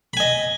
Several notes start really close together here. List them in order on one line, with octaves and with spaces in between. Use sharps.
B5 G#5 D#5